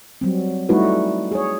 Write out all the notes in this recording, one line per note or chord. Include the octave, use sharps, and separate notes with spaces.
F#3 G3 C4
G3 A3 D#4 E4 F#4 B4
G#4 C#5